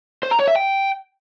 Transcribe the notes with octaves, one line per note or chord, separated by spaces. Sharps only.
C5
A#5
C#5
E5
G5